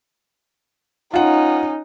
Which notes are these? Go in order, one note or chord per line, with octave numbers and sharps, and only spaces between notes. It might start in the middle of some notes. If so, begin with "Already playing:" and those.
C#4 D#4 F4 F#5